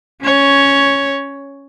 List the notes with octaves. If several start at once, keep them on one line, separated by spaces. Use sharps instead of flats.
C#4 C#5